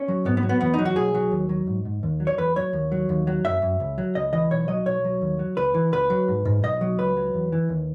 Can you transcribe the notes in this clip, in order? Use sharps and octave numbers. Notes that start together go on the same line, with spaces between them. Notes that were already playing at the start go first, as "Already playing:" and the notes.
Already playing: C#4
F#3
G#2 B3
B3
F#3
B3
E2 B3
F#3 D#4
F#4
B1 G#4
F#3
D#2
F#3
G#2
G#2
D#2
F#3
C#5
E2 B4
F#3 C#5
D#2
F#3
D#2
F#3
F#2 E5
F#2
C#2
F#3
C#2 D#5
E3 D#5
B1 C#5
F#3 D#5
B1 C#5
F#3
D#2
F#3
C#2 B4
E3
C#2 B4
F#3
G#2
G#2
B1 D#5
F#3
C#2 B4
F#3
E2
E3
D#2